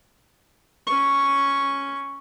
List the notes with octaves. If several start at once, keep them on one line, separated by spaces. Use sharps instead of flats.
C#4 C#6